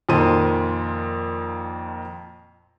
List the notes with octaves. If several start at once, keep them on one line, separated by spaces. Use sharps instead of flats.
F2 A#2 D#3 F3 C6 D#7